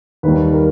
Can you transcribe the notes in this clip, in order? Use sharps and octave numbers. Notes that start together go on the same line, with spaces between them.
D#2 D#3 G3 B4
A#4